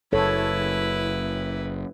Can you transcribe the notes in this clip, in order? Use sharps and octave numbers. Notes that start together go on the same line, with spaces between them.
F#1 E4 A4 B4 C#5